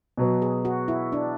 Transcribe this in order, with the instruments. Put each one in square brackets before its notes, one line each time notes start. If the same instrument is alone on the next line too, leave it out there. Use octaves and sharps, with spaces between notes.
[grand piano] B2 F#3 B3
[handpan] G#4
F#4
E4
D4